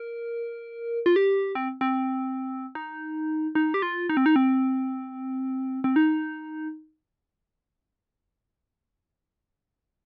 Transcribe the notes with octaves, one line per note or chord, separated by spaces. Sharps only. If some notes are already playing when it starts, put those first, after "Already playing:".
Already playing: A#4
F4
G4
C4
C4
D#4
D#4
G4
F4
D#4
C4
D#4
C4
C4
D#4